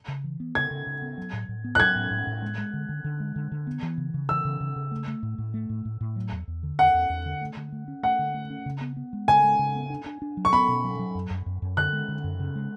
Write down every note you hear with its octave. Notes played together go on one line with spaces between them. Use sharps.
C#3
E3
B3
C#3 G#6
C#3
C#3
B3
F#3
A2
A2
B3
F#6
F#3 G#6
A2
A2
A2
G#3
G#3
D3
D3
D3
G#3
D3
D3
B3
E3
C#3
C#3
E3 E6
C#3
C#3
C#3
A3
A3
A2
A2
A3
A2
A2
A2
F#3
E2
E2
D3
E2 F#5
E2
E2
D3
A3
D3
A3
C#4
A3 F#5
D3
A3
C#4
C#3
B3
B3
G#3
C#3 G#5
G#3
C#3
B3
D4
D4
D4
F#3
C#6
B3 B5
B2
F#3
F#3
F#2
F#2
F#2
F#2
D3 F#6
G#3
D3
F#2
C#3
G#3